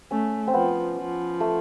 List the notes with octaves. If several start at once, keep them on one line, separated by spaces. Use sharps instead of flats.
A3 C#4
C4
F3 B3
F3
A3